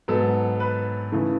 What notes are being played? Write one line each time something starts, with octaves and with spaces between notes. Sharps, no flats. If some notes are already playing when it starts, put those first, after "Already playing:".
G#2 F#3 B3 A4
B4
C#3 E3 A3